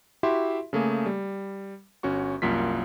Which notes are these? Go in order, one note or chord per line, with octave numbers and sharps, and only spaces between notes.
E4 F#4 G4 E5 C6
C#3 A3 A#3 G#4
G3
G1 C#4 F#4 C#6
C2 F#2 A#3 F4 B6